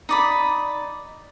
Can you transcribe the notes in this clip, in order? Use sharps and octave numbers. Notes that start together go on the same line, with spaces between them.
D#4 D5 B5